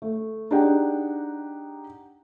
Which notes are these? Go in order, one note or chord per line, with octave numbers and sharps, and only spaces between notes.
A3
D4 D#4 G4 G#4 F#5 G5